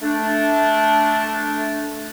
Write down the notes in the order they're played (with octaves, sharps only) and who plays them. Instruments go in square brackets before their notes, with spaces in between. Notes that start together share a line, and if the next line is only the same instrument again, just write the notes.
[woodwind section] A3 D4